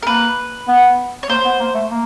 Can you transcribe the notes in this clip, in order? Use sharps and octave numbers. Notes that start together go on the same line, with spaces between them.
A#4
A#3 B4
B3
C#5
A#3 C5
B3
A#3
A3
A#3